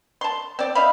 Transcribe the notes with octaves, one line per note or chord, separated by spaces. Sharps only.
A5 C6
C4 D5
D#4 E5 F5 B5